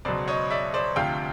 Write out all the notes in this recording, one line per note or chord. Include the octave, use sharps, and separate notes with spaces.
C#2 B2 F#3 C5 D5
C#5 D#5
D5 E5
C5 D5
D2 C3 F3 F5 G5